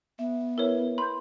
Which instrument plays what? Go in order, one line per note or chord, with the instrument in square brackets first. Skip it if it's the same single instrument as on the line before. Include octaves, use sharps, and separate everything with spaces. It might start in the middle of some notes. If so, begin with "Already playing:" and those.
[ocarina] B3 [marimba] E5
[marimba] E4 B4 E5 [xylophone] A#4 C#5
[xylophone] B5 [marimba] C6 G6